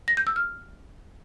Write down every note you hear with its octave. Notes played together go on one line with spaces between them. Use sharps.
A#6
G6
E6
F6